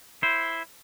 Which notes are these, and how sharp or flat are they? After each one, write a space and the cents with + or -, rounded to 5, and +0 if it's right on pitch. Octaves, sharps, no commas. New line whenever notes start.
E4 +0 C5 +0